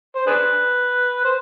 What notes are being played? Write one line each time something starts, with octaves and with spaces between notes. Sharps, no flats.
C5
D4 G#4 B4
C5